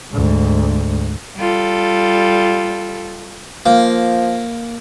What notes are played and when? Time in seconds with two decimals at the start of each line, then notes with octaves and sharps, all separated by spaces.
0.12 D2 G#2
1.37 G3 F4 A4
3.66 F3 A#3